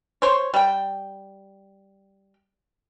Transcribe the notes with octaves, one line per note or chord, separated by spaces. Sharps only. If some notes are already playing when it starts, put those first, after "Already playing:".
C5 C#5
G3 G5